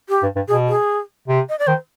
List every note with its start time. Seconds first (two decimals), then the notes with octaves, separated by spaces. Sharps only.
0.09 G4
0.22 G2
0.36 G2
0.48 B2 G#4
0.68 G#4
1.28 C3
1.49 D#5
1.59 D5
1.67 D#3 C5